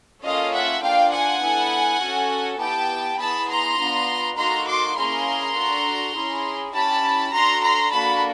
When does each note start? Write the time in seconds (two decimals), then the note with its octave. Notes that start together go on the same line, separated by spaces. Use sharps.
0.23 A#3 C#4 F4 A4 D#5 F5
0.53 E5 F#5
0.82 A#3 D4 F4 F5 G5
1.12 F#5 G#5
1.42 B3 E4 A4
2.01 C#4 F#4 A4
2.60 B3 E4 G4 G5 A5
3.19 B3 E4 G#4 A5 B5
3.49 A#5 C6
3.78 B3 D4 F4
4.37 A#3 D#4 F#4 A4 A#5 C6
4.67 C6 D6
4.97 A#3 C#4 E4 G#4 A#5 C6
5.56 D4 F#4 A4
6.15 C#4 E4 G#4
6.74 C#4 E4 G4 A5 B5
7.33 D4 F#4 A4 A#5 C6
7.63 A#5 C6
7.92 A#3 D4 F#4 A4 A5 B5